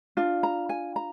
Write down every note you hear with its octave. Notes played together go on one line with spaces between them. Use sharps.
D4 F4
A#5
G#5
A#5